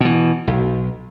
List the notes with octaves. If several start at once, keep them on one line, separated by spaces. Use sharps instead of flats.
B2 E3
B1